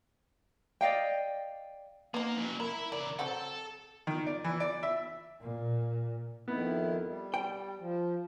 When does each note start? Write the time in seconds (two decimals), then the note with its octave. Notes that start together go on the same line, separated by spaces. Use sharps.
0.81 D5 D#5 F5 G5
2.14 A#3 B3 D#4
2.37 C#3 F#3
2.60 A#4 E5 B5
2.92 C#3 A#4 D5
3.19 F#3 C4 F#4 A4
4.07 D#3
4.27 D5
4.44 E3
4.60 D5
4.83 E5
5.41 A#2
6.48 F2 D#3 B3 E4
7.07 G3
7.34 G5
7.79 F3